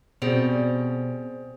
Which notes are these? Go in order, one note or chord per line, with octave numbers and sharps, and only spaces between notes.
B2 G3 C4 G#4 C5